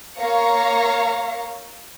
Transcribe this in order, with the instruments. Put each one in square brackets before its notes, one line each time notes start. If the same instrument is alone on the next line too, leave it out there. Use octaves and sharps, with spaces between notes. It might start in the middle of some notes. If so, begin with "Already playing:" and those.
[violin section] A#3 C#5 F5 A#5 C#7